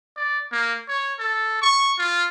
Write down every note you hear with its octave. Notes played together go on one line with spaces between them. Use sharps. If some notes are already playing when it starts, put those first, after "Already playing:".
D5
A#3
C#5
A4
C#6
F4